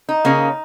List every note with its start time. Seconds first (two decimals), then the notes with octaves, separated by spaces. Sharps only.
0.09 D#4
0.25 C#3 A#3 C#4